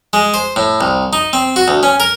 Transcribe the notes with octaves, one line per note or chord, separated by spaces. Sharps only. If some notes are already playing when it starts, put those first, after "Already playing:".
G#3
C5
A2
C2
D#4
C4
F#4
D2
C#4
A#4